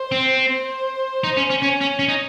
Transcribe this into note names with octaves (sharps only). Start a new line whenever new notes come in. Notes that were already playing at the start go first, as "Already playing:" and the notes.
Already playing: C5
C4
C5
D#4
C#4
C#4
C#4 C#5
C#4
C#4
D#4